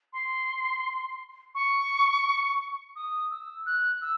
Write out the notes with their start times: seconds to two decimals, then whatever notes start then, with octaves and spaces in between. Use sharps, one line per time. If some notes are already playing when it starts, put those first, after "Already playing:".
0.13 C6
1.55 C#6
2.96 D#6
3.31 E6
3.66 F#6
4.01 E6